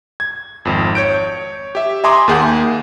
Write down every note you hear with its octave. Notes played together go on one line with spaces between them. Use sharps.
G#6
G#1 F2
C#5 G6 D7
G4 E5
E5 G#5 A#5 C6 D6 D#6
D#2 A#3 G#4 F#5 G6